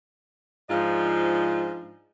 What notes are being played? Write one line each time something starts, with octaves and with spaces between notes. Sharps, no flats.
G#2 F3 D4 F4 D#5